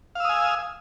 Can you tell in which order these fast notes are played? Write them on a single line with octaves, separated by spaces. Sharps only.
F5 E6 D#6 G#5